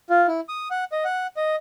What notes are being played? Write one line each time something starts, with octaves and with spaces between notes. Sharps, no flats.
F4
E4
D#6
F#5
D#5
F#5
D#5